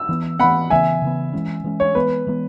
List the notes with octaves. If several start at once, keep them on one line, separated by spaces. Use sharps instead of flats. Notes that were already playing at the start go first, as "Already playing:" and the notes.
Already playing: E6
E3 B3
E3 B3 F#5 B5
C#3 E3 B3 E5 G#5
C#3 E3 B3
E3 G#3 C#4
E3 G#3 C#4
C#5
E3 G#3 B3 B4
E3 G#3 B3